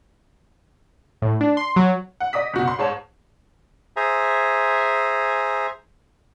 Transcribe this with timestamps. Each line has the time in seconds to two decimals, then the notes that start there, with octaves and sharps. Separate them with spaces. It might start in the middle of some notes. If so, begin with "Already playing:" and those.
1.22 A2
1.41 D4
1.57 C6
1.76 F#3
2.20 F#5
2.33 D#5 D6 D#6 B6
2.53 F#1 B2 F#4
2.65 F#5 C6
2.79 G#2 C#5 A5
3.96 G#4 C5 E5 G#5 A#5